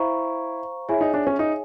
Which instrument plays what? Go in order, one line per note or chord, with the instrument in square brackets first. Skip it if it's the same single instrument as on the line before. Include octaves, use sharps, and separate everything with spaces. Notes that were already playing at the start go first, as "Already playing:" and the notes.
Already playing: [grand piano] E4 [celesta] C5 F5 A#5 C#6
[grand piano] E4 [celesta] G#4 C#5 E5 G#5
[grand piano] D#4
D4
C#4
D#4